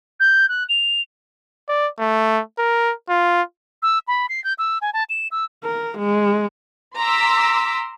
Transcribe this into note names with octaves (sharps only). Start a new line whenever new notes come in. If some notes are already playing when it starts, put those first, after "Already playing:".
G6
F#6
F7
D5
A3
A#4
F4
E6
B5
C7
G6
E6
G#5
A5
E7
E6
A#4
G#3
A#5 C6 D6 E6 B6